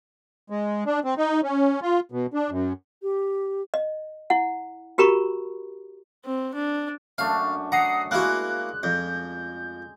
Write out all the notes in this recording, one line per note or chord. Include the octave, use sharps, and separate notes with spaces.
G#3
D4
C4
D#4
C#4
F4
B2
D4
F#2
G4
D#5
E4 F#5
F#4 G4 A#4 A#5 B5 C#6
C4
D4
F#2 A3 D4 F5
F#5 A#5 D#6 C7
G#3 A#3 E4 F#4 F#6
F2 G6